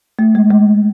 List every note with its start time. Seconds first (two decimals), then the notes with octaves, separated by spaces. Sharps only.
0.19 A3
0.35 G#3
0.50 G#3